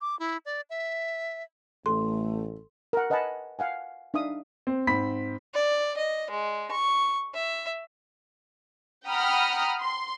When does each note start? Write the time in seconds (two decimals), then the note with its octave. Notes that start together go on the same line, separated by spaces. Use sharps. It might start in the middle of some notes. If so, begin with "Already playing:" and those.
0.01 D6
0.19 E4
0.46 D5
0.70 E5
1.86 A1 A3 A4 C6
2.93 A#4 F#5
3.10 B4 D#5 F#5 G#5 A5 B5
3.59 F5 F#5 G#5
4.14 D4 D#4 E5 F5 D#6
4.67 C4
4.87 G#2 C4 B5 B6
5.54 D5
5.97 D#5
6.30 G#3
6.71 C#6
7.34 E5
9.07 F#5 G5 A#5 B5 D#6 F6
9.79 C6